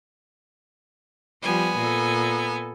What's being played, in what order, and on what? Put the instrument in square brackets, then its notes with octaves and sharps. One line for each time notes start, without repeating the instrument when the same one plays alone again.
[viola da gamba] F3 G3 [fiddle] B3 G#5
[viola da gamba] A#2 A4